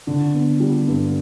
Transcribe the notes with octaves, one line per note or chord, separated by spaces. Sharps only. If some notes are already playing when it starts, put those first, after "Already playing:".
D3
B3
G3
G2